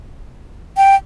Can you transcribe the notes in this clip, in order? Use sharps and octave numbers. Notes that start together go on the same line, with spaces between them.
G5